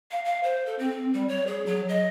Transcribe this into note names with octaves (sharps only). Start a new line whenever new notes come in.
F5
F5
C5
A4
C4
G3
C#5
G#4
F#3
D#5